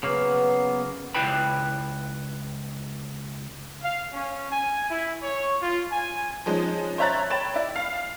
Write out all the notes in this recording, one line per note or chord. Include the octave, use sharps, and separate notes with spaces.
C#3 F#3 A#3 B3
C#2 E4 B4 G5 B5
F5
C#4
G#5
E4
C#5
F4
G#5
F3 G#3 C#4 D#4
C5 C#5 E5 A#5 F#6 A6
C#5 G5 B5 A6 E7
E4 D5
F5